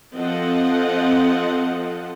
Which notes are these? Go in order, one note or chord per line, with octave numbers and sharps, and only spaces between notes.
F3 C4 A4 D#5 F#5